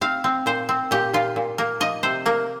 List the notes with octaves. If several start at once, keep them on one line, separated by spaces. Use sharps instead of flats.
C4 F5
C4
A#2 C5
C4
A#2 G4
A#2 F4
A#2
A#3 A#4
F3 D#5
C3 C5
A#3 A#4